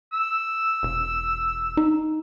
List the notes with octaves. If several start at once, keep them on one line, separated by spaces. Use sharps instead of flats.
E6
E1
D#4